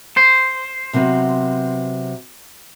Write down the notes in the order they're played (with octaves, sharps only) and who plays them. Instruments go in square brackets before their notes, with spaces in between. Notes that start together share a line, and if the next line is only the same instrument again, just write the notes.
[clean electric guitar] C5
[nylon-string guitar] C3 F#3 B3